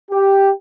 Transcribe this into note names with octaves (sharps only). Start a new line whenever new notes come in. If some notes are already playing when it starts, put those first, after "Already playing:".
G4